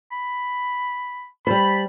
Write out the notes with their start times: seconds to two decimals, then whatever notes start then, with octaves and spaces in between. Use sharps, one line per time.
0.12 B5
1.47 G3 C5 A5 B5